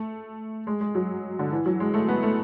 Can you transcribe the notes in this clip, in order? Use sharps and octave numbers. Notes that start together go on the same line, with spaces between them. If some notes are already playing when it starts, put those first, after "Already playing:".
Already playing: A3
G#3
G#3
F#3
D3
E3
F#3
G#3
A3
B3
A3